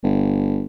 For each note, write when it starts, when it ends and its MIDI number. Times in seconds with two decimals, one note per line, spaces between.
0.04 0.66 31